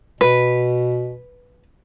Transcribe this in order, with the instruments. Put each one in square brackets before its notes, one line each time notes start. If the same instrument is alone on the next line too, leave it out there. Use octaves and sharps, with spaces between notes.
[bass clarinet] B2 [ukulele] B4